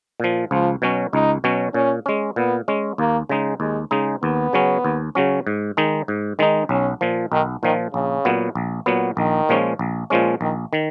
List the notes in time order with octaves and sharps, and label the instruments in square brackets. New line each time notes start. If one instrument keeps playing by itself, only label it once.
[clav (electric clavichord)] A#2 F3
[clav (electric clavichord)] C#2 [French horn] F3
[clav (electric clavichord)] B2 F#3 C#4
[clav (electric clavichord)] C#2 [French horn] D#4
[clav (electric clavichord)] B2 F#3 C#4
[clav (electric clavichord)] A#2 [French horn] C#4
[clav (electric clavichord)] G#3 C#4
[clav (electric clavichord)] A#2 [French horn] B3
[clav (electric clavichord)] G#3 C#4
[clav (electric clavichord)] D#2 [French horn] A#3
[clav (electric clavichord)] C#3 G#3 D#4
[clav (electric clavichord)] D#2 [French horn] G#3
[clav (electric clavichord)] C#3 G#3 D#4
[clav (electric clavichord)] D#2 [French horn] B3
[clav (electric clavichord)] C#3 F#3 C#4
D#2
C#3 F#3 C#4
G#2
D#3 G#3 D#4
G#2
D#3 G#3 D#4
[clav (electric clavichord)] B1 [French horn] C#4
[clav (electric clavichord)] A#2 F3
[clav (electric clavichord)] B1 [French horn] D#3
[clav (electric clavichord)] A#2 F3 [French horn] D#3
[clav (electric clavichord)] A#1 [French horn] C#3
[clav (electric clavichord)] A#2 F#3 B3
A#1
A#2 F#3 B3
[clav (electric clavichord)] A#1 [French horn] D#3
[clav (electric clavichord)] A#2 F3 G#3 C#4
A#1
A#2 F3 G#3 C#4
[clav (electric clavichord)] A#1 [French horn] D#3
[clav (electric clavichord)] D#3